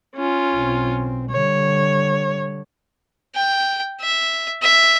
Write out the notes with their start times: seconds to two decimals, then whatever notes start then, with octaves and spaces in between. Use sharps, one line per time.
0.15 C#4 F4
0.53 B1 C4
1.31 D3 G3 C#5
3.35 G5
4.01 E5
4.62 E5